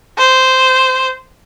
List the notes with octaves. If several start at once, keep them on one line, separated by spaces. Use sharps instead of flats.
C5